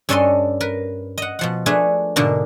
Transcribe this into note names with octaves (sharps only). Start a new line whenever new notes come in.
G2 C#4 D4 A4 D#5 C6
A#4 B4
D#5 F#5
B2 F3 F#5
A3 D4 G#4 B4
G#2 B2 D3 A#3 D4